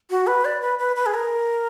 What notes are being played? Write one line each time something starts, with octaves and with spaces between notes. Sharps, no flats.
F#4
B4
D5
B4
B4
B4
G#4
A#4